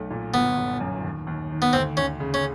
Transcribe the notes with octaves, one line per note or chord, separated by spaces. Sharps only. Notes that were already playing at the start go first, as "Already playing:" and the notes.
Already playing: B1 A3
A#2
G1 B3
G1
F#2
D#2
D#2
D#3
B3
D2 C4
D2 C#4
C#3
C#4